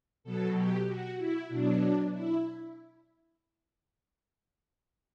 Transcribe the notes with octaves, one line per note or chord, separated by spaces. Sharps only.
B2 F#3 A4
G4
F#4
E4
B2 F#3 D4
E4